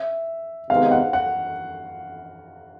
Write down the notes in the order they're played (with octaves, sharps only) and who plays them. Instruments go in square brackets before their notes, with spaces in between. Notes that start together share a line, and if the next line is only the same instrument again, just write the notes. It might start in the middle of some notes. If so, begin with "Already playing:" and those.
Already playing: [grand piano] E5
[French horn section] C3 D#3 G#3 B3 [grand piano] F5
[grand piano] F#5
F#5